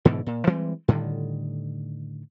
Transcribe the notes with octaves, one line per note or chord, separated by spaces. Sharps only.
G#2 B2 D3 E3
A#2
E3 G3 G#3 C4
A2 D3 D#3 G3